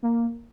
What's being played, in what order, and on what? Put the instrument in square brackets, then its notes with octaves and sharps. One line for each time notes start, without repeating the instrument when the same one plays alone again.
[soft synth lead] A#3